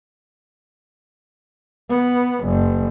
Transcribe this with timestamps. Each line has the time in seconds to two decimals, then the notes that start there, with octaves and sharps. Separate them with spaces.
1.90 B3
2.45 F#1